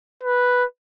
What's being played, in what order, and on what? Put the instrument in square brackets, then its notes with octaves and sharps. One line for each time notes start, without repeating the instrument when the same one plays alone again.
[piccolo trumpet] B4